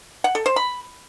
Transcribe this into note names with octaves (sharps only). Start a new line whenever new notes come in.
F#5
A4
C5
B5